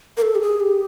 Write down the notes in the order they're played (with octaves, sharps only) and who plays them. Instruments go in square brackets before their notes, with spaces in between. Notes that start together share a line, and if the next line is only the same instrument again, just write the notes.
[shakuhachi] A#4
A4
G4
G#4
G4